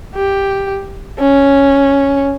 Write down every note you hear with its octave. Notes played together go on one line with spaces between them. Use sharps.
G4
C#4